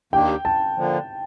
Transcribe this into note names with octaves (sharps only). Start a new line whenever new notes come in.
D#2 D#3 A#3 D4 G4 G5
A5
D3 F3 A#3